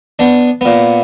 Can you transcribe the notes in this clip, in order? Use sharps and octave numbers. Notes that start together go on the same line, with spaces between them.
B3 D4
A#2 B3